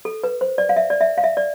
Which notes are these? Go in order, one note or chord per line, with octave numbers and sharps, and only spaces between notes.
A4
B4
C5
D5
F5
E5
D5
E5
F5
E5
D5